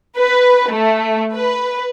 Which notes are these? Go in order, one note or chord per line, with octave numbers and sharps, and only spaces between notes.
B4
A3
B4